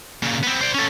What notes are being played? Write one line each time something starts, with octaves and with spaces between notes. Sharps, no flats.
A#2 C#3
B3 C4
C5 D5
C#4 A4